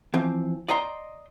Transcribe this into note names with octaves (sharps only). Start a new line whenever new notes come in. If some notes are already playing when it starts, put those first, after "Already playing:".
E3 F3 C4
D5 D#5 G5 A#5 C6